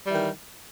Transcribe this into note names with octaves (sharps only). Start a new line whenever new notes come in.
D#3 E3 G3